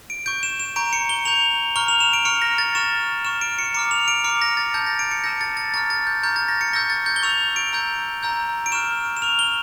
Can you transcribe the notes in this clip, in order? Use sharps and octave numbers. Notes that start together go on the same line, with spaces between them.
D7
C#6 G6 D7
E7
E7
A#5 C#6 G6 D7
C#7
G7
A#5 C#6 G6 F7
A#5 C#6 F6 G7
F7
E7
D7
A#5 C#6 F6 C#7
A#6
A6
C#6 F6 E7
C#6 F6 E7
D7
C#7
A#5 D6 F6 C#7
F7
D7
A#5 D6 F6 C#7
A#6
A6
A5 E6 G6 A6
A#6
D7
C#7
A5 E6 G6 A#6
A6
A6
A#5 C#6 F6 A6
A6
G6
A#5 C#6 F6 G6
A6
A#6
C#7
C#6 E6 G6 A#6
A6
G6
G7
C#6 E6 G6 F7
D7
A#5 E6 G6
A#5 E6 G6
D7
C#6 F6 E7
E7
C#6 F6 F7
G7